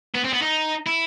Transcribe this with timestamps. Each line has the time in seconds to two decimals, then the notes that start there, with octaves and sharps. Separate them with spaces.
0.14 B3
0.24 C4
0.33 B3
0.42 D#4
0.87 E4